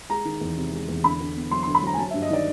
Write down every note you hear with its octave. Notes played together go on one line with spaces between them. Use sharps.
G#3 A#5
D#3
E2
C3
G#3
E2
D3 B5
D3
B3
F#3 C6
C6
D3
B5
F#3 A#5
G#5
F#3 A5
E5
G2
D#5
D#3 D5